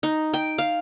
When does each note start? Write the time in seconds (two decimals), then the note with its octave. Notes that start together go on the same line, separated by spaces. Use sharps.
0.03 D#4
0.34 G5
0.58 F5